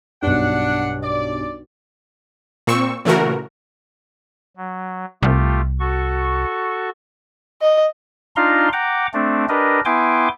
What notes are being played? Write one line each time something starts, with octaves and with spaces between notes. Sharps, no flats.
B1 G2 D4 F#5
D5
A#2 C4 C#6 E6
A#2 C#3 E3 A3 F#4 A#4
F#3
C2 A3 F4 G4
F#4 A4 C#6
D#5
D4 D#4 F4 F5 A#5 C6
F#5 G5 A#5 D6
A3 C4 D4
D4 G4 A#4 B4 D#5
B3 E4 G5 G#5 C6 D6